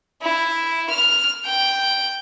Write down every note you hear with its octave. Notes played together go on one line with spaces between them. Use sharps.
E4
F6
G5